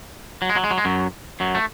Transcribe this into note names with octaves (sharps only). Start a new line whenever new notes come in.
F#3
G#3
F#3
G#3
F#3
G#3
F#2 F#3
F#2 F#3
A3